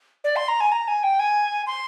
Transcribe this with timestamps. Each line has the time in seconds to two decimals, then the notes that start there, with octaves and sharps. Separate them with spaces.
0.24 D5
0.36 C6
0.48 A#5
0.60 G#5
0.72 A#5
0.88 G#5
1.03 G5
1.20 G#5
1.67 C6